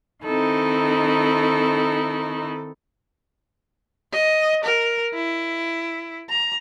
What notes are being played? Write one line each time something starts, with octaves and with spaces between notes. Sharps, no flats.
D#3 C4 D#4 E4 A4
D#5
A#4
E4
A#5